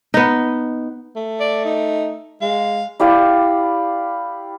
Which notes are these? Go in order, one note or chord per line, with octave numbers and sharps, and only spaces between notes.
B3 D#4
A3
D5
D#4
G#3 F5
E4 G4 D5 F5